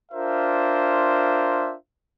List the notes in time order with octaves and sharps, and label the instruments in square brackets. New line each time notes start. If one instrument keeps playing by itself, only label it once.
[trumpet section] D4 F4 A#4 C5 E5